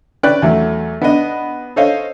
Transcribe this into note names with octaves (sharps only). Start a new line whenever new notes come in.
C#4 B4 D5 G5 F#6
E2 F#3 A3
B3 D4 D#5
A4 C5 C#5 D#5 F5